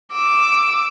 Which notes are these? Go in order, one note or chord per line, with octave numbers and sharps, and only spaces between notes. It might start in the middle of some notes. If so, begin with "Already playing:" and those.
D6 E6